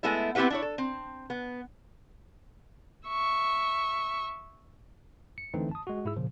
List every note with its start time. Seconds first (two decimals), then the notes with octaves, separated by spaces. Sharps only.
0.03 G#3 A3 B3 E4 E5
0.35 B3 C4 E4 G4 B4 F#5
0.50 D4 E4 C#5
0.62 A4
0.78 C4
1.30 B3
3.08 E5 C#6
5.38 C#7
5.54 D3 E3 A3 C4 D#4
5.71 A5 D#6
5.87 G#3 F#4
6.05 G#2 E4 G#4 E6
6.16 A#2 C#3 F3